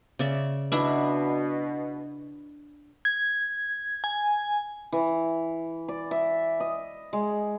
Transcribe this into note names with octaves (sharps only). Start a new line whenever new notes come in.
C#3 D5 E5
B2 D4 E4
G#6
G#5
E3
D5
E5
D#5
G#3